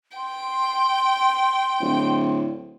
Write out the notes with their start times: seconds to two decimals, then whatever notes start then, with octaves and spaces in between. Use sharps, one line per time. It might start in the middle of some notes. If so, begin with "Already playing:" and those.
0.17 G5 C6
1.80 D1